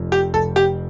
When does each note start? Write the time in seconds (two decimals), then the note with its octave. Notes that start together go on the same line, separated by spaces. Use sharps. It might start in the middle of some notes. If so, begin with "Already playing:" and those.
Already playing: F1 F2
0.12 G4
0.34 F1 A4
0.56 G4